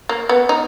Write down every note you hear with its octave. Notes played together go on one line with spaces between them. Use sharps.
A#3
B3
D#4